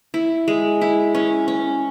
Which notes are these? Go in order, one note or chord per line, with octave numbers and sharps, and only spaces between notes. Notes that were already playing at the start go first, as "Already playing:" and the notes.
E4
G#3
E4
C#4
C#4